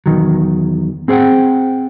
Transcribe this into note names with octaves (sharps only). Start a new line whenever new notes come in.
E2 C3 D#3 F#3
C4 G#4 C5 F#5 G5